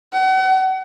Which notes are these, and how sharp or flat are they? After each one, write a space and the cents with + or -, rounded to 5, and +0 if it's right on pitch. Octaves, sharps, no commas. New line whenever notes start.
F#5 +35